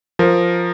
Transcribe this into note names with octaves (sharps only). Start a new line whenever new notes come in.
F3 A#4